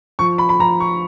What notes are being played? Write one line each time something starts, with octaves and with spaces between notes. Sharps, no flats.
F3 C#6
B5
B5
F3 A#5
C#6